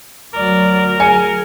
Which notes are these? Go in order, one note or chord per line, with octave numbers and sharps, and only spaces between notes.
D2 F#3 A#4 D5
G#4 G#5 C#7